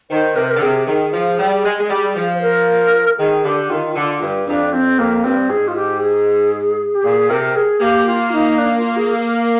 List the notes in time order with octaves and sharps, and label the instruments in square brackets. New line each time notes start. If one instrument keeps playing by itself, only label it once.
[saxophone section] D#3 [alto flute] C5
[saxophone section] C3 [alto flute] A#4
[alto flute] C5
A#4
[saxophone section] D3
[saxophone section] C3 [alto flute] G#4
[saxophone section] D#3 [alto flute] G#4
[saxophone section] F3
G3
G#3
G#3
G3
F3
[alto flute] C5
A#4
[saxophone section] D#3 [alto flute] G#4
[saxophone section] D3 [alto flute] G4
[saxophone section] D#3 [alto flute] F4
[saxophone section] D3 [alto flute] F4
[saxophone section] G2
[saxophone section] F2 [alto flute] D4
[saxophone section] F2 [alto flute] C4
[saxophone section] F2 [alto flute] A#3
[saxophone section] G2 [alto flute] C4
[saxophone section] G#2 [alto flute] G#4
[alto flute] F4
G4
G#4
G4
[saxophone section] A#2 [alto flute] G#4
[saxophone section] C3 [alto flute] A#4
[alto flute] G#4
[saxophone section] A#3 [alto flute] G4
[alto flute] F4
D#4
D4
F4
G#4
A#4